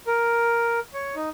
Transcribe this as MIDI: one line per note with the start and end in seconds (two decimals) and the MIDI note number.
0.07 0.80 70
0.94 1.15 73
1.16 1.30 63